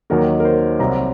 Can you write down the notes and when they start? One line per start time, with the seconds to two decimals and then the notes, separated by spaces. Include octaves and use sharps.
0.10 D#2 D#3 F#3 A#3 A#4
0.40 A#4
0.45 C5
0.79 C2 C3 F#3 C4 A#5